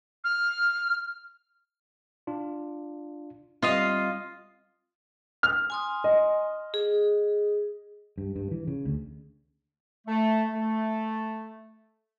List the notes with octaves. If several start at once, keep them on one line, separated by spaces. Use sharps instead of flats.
F6
D4 F4
G3 C4 F4 D#5 F5
F6
G#5 C6 D#6
D#5
G#4
G2
G2
E3
C#3
D2
A3
A3